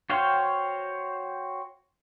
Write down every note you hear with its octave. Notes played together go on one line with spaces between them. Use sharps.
F#4 C5 C#5 F5 G5